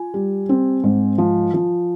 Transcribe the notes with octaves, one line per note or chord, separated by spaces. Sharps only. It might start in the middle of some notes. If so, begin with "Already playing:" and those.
Already playing: F4 G#5
G3
C4
G#2
F3
F3